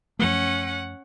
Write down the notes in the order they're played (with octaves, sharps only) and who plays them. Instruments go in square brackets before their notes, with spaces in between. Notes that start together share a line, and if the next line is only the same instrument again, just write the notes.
[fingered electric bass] F#2 F3 A3 [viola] C#4 F#5